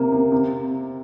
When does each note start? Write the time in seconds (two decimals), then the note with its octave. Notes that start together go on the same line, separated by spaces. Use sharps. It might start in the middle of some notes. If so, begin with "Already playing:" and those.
Already playing: C3 A#3
0.12 C3
0.32 C3